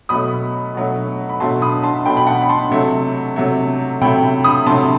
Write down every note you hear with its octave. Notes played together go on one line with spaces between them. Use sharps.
B2 F#3 A3 B5 D#6
B2 F#3 A3
B5
B2 F#3 A3 A5 C6
B5 D#6
A5 C6
B2 F#3 A3 G5 B5
B5
F#5 A5
B5
A5 C6
C3 F#3 A3
C3 F#3 A3
C3 F#3 A3 G5 B5
B5 D#6
C3 F#3 A3 A5 C6